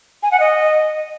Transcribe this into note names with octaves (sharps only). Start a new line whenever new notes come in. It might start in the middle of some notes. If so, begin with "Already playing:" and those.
G#5
F#5
D#5